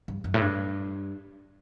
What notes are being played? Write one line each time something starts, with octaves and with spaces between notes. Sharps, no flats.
G2
F#2
A2
G2